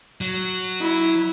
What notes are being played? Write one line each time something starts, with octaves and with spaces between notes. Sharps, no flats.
F#3
E4